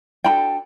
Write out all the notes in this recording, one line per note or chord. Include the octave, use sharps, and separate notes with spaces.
D4 F#4 A4 G5 B5